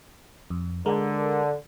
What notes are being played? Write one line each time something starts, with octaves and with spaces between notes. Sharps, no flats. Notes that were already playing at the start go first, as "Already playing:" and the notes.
F2
D3 G#3 A#4